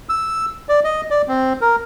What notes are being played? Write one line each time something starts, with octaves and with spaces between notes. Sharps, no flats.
E6
D5
D#5
D5
C4
A#4